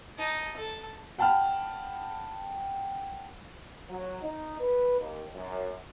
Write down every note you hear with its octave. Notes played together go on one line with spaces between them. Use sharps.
D#4 A5
A4 A5
F#5 G5 A5 B5 F6
F#3
D#4
B4
D#2
F#2